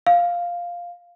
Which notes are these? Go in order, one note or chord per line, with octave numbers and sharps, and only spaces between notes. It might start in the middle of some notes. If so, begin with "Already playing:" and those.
F5